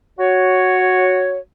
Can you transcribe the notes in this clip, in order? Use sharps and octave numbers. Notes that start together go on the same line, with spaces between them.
F#4 C#5